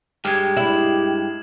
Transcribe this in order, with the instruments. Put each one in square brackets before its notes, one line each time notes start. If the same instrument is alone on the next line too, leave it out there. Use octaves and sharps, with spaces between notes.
[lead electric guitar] G2 G#3 [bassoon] G4 [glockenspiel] F6 G#6
[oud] E4 [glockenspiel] E7 F#7